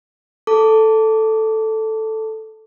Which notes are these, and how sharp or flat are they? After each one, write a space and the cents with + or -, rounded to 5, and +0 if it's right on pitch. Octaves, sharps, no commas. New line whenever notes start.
A4 +0 A5 +15 D6 -20